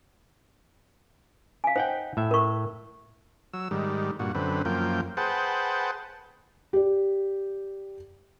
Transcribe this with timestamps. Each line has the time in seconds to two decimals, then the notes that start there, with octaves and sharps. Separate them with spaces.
1.64 F5 G#5
1.76 D#4 C5 F#5 G5
2.17 A2 E5
2.31 A#4 C#6
3.53 F#3 E6
3.71 G#2 D#3 G3
4.19 G2 A#2 F#4
4.35 F#2 D3 C4 B4
4.65 F#2 F3 A#3 G5
5.17 G#4 B4 C5 F#5 G5 A5
6.73 G4 D5